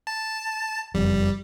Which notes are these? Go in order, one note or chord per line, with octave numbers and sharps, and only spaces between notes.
A5
F#1 F2 G3